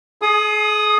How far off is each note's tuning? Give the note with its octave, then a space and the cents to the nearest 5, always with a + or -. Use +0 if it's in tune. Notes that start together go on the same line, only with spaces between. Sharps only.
G#4 +35 D#6 +0